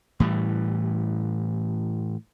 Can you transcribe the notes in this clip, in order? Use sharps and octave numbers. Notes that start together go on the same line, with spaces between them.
A2 E3 G3